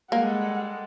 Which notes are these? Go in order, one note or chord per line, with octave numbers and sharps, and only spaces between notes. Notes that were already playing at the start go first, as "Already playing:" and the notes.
G3 G#3 A#3 A4 F#5